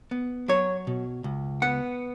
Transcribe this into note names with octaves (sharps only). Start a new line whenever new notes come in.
B3
F#3 C#5
B2
C#2
B3 F#5